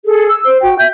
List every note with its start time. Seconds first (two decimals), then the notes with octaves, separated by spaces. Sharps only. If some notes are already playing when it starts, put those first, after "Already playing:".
0.05 G#4 A4
0.28 E6
0.45 C5
0.62 F#4 G5
0.78 E5 G6